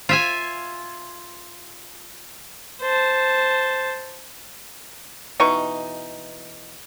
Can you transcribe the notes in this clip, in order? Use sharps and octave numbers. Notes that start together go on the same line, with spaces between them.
F4 E5 G#5
C5 A5
B2 E3 D#4 C#6